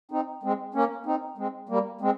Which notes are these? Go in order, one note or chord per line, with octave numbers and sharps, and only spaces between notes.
C4 D#4
G#3 C4
A#3 C#4
C4 D#4
G#3 C4
G3 A#3
G#3 C4